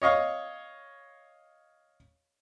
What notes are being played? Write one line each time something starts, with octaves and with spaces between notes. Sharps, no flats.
C#5 D#5 F5 C#6